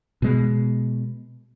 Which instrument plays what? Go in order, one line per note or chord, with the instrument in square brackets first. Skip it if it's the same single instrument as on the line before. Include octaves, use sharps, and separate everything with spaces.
[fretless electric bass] B2 G#3